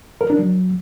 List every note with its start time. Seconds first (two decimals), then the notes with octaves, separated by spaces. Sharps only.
0.21 A#4
0.30 D4
0.39 F#3